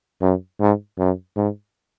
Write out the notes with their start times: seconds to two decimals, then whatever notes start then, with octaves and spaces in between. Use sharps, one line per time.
0.21 F#2
0.60 G#2
0.98 F#2
1.36 G#2